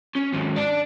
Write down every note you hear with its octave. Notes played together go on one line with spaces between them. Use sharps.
C#4
D#2 G#2
D5 A5